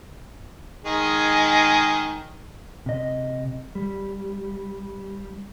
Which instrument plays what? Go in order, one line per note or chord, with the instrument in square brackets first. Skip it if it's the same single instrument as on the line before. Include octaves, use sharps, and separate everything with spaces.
[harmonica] D#3 G#3 G#4
[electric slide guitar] C3 D#5
G3